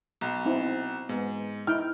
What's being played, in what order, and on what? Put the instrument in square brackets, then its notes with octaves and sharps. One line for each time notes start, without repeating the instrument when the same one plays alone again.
[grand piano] B1
[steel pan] C4 D#4 E4
[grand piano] G#2 [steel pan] B3
[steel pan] D#4 E4 G5 [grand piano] F6